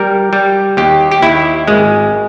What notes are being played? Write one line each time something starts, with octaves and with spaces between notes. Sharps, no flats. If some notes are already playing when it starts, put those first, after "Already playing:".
Already playing: G3 A#4
G3
D#2 G4
G4
D#2 E4
G#1 G#3